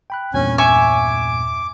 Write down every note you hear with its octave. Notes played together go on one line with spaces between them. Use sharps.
G5 B5 F#6
E2 G2 A#2 C#4 G#5
E5 G#5 C#6 D6